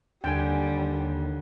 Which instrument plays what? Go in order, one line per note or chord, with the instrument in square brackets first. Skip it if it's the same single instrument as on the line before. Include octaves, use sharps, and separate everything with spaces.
[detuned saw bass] D#2 [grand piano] D3 [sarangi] G3 [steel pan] G5 G#5